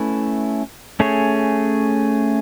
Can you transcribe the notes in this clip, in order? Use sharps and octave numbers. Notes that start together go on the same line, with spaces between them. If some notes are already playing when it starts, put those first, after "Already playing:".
Already playing: A3 C#4 E4 B4
A3 C#4 G#4 C#5